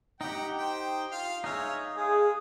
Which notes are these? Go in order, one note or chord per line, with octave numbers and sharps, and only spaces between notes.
D#4 G4 F#5 G5
C5 G5
F4 F5
D#4 G#4 C#5 E5 F5
G#3 G#4